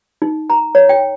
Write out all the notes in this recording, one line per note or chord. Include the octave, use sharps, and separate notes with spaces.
D#4
A#5
C#5
G5